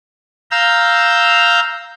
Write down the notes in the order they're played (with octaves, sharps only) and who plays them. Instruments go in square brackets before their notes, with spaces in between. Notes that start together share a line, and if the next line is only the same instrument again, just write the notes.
[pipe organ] F5 A#5 E6 G6